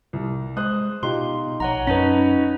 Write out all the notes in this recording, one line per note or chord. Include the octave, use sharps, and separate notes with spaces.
C2
G#3 C5 D#6 F#6
B2 D#4 F4 G4 C6
A#1 C#5 F#5 A#5
F#2 C#4 D#4 B4 A5 A#5